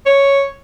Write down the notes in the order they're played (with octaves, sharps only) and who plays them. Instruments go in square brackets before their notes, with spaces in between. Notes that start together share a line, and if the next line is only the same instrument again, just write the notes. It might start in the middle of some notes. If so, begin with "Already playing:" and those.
[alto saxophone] C#5